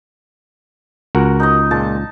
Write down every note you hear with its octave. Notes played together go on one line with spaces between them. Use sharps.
C#2 F#4 A#4 F#5
D#4 D#5
A#2 G#3 A5